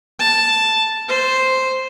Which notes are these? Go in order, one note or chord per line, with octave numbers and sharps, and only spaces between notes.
A5
C5